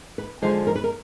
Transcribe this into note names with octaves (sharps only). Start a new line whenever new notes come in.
B4
D3 F3 G#3 C5
A#4
B4
A#4